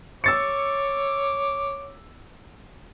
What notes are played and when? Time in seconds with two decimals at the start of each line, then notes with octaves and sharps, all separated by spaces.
0.24 C#5 D6 E6 A6 C#7